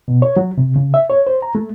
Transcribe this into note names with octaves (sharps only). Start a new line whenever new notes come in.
B2
C#5
F#3
C3
C#3
E5
C#5
C5
A#5
A3